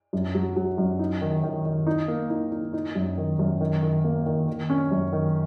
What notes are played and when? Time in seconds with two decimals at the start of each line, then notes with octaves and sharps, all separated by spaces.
0.13 F#2
0.35 F#3
0.56 F#3
0.78 F#2
0.99 D#4
1.21 D#3
1.43 D#3
1.65 D#3
1.87 D#4
2.08 A#3
2.30 D#4
2.51 D#4
2.73 D#4
2.95 F#2
3.18 D#3
3.39 F#2
3.60 D#3
3.82 D#3
4.04 A#3
4.26 D#3
4.48 D#3
4.70 C#4
4.91 F#2
5.13 D#3